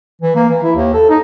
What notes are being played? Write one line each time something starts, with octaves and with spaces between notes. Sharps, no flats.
E3
A#3
E3
E4
D#2
A4
D#4